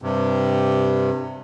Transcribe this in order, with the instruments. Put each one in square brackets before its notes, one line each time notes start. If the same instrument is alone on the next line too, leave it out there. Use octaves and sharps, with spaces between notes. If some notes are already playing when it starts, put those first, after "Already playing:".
[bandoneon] G2 C3